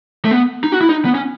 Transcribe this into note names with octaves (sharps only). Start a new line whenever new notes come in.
A3
B3
D#4
F#4
E4
D#4
B3
C#4